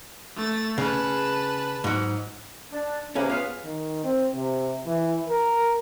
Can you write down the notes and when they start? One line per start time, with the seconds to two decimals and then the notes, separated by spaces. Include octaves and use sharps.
0.36 A3 A6
0.78 C#3 B4 A5
1.84 G#2 F#3
2.72 D4
3.15 C3 A#3 C#4 G#4 B4
3.29 B3 F4 G#4 B4 F5
3.64 D#3
4.04 C4
4.35 C3
4.86 E3
5.28 A#4